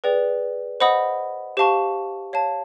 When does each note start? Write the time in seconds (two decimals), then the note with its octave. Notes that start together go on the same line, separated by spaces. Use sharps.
0.04 G#4 B4 D5 G5
0.80 C5 D#5 F#5 B5 D#6
1.57 G4 C5 F5 A5 C#6
2.33 C#5 F5 A5